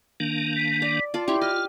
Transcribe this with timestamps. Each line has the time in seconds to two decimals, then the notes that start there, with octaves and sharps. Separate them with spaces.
0.20 D#3 A#3 D4
0.56 B6
0.82 D5
1.14 F4 D5 A5
1.28 C#4 E4 G4 C6
1.42 F4 D#5 F6